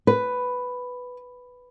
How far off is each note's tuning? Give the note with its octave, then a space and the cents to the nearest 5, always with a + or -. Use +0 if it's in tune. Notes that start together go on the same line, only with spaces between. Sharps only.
B4 +5